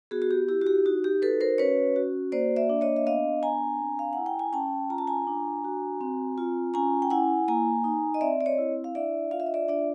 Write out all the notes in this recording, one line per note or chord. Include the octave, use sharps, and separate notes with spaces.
B3 F#4 G#4
F#4
G4
E4 G4
F#4
G4
D#4 F#4
G4
F#4 A4 B4
A#4 C5
C#4 B4 C#5
F#4
A#3 C5 D5
D5 E5
D4
C#5 D#5
E5
B3 D#5 F5
D4 G#5 A#5
C4
F5
E4 F#5
G5
G#5
C#4 G5 A5
F4 A#5
A5
G#5 A#5
D4
F#4
C4
F4
C#4 G#5 A#5
G5
E4 F#5 G#5
A#3 G#5 A#5
D#4
D#5
C4 D5 E5
D5
C#5 D#5
E4
F5
D4 D5 E5
F4 F5
E5
D#5
D5 E5
D4 D5 E5